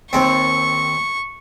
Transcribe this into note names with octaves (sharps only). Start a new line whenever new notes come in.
D#2 C4 C#6